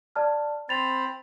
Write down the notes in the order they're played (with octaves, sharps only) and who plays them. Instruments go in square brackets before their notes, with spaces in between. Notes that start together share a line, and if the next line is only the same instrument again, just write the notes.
[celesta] D5 A5 F6
[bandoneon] C4 C5 B5 [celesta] A6 F7